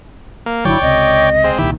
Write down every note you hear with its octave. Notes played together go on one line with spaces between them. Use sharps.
A#3
G1 D3 F#3 E4 C#5 D5 G5
C#2 C3 D#5
G#3 C4
C2 A#2 D#3 E4 G4